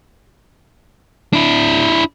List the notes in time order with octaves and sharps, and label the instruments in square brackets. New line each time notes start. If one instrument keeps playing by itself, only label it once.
[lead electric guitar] D4 E4